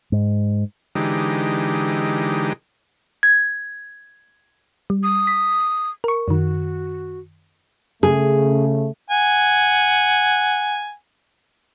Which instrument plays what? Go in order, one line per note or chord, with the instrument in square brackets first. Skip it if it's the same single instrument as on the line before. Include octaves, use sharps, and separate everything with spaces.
[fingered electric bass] G#2
[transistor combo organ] D3 E3 G#3 D#4 G4
[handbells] G#6
[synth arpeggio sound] G3
[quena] D#6
[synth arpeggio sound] B6
A#4 C#6
[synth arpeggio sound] F#2 D#3 [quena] F#4
[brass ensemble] C#3 A3 [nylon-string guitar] G#4
[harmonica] F#5 G#5